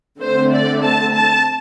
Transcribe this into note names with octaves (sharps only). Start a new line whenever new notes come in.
D3 A3 C4 C5
D5
A5
A5